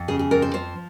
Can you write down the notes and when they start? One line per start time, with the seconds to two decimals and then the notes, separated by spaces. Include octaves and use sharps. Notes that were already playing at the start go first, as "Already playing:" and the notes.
Already playing: F2
0.08 C#3 G#4
0.19 G#4
0.31 F2 A#4
0.42 C5
0.54 F3 C5